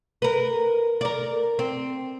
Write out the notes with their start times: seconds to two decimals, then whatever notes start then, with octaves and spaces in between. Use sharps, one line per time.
0.22 A#4 B4
1.01 A#4 D5
1.59 C4